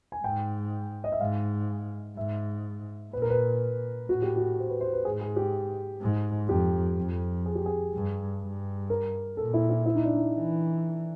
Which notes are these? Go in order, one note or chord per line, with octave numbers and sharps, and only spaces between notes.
G#5
G#2 G5
D#5
E5
G#2 F5
G#2 E5
A#2 B4
A#4
B4
A2 F#4
G4
F#4
C5
B4
C5
B4
G#2 G#4
G#4
G4
G#2
F2 G4
F2
G#4
G4
G#4
G2
G2
A#4
A#2 A4
E4
E4
E4
D#4
D4
D#4
E3